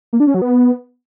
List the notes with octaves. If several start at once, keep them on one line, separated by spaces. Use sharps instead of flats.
A#3
D4
C#4
F#3
B3